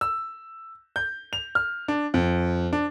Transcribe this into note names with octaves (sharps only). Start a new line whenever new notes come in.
E6
G6
F7
F6
D4
F2
D4